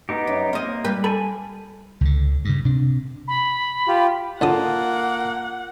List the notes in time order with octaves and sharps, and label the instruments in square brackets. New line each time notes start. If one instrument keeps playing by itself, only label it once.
[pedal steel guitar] B3 D#4 G4
[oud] F#2
[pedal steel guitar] A#3 [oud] C4 D#5
[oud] G3 B4
[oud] A4 [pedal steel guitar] G#5 B5
[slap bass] C#2 D3
G2 C#3
C3 D4
[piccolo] B5
[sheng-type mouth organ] F4 G4
[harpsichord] C#2 D3 D#6 [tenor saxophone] A#3 [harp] F4 A5 [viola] F#5